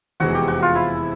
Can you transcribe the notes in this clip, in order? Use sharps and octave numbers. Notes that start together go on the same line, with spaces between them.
F1 E2 C3 E3 G#3 F#4
G4
F#4
F4
E4